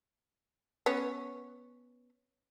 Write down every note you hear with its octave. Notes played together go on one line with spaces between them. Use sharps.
B3 C#4 C#5